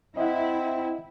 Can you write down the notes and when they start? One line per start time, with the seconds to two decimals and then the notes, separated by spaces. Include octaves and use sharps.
0.17 C4 E4 D#5 E5 F#5